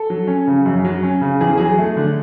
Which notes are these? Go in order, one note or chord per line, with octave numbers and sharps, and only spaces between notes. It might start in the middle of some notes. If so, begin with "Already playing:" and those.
Already playing: A4
F#3
C#4
C#3
F#2
F#3
C#4
C#3
E2 G#4
F#3 G#4
A3
D3